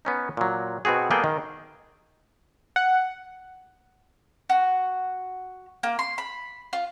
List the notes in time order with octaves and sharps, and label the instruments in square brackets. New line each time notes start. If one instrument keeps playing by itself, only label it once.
[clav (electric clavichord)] B3 C#4 D#4
A#2 F#3
B2 B3 C4 F#4 G#4
G3 A#3 B3 G#4 A4 G5
D#3
[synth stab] F#5
[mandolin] F#4
A#3
C6
B5
F4